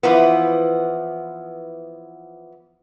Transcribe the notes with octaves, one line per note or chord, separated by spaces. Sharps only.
E3 F3 B3